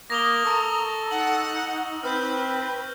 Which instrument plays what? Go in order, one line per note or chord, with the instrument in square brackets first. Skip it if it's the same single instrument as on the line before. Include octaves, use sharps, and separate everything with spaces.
[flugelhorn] A#3 [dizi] D6 [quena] D#6 [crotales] A#6 F7 G7
[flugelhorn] A4 [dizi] A#5 [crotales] C#6 E6
[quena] D#4 [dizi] F#5 [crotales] F#7
[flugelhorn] C4 [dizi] B4 [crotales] F6 G6